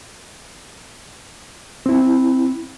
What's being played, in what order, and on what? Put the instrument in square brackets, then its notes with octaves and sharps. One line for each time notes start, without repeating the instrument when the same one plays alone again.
[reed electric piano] C4 E4